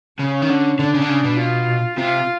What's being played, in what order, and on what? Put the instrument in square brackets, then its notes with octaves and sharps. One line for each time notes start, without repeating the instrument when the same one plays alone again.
[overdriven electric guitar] C#3 [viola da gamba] C#4
[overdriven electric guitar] D#3
D3
[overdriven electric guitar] D3 [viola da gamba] D4
[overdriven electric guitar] C#3
D3
C#3
B2
[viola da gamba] F4
[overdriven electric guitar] C3 [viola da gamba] F4